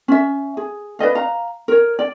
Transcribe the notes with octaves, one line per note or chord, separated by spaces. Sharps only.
C#4 E5
G#4
B4 D5 D#5 F5
F5 A#5
A#4 C#5
D5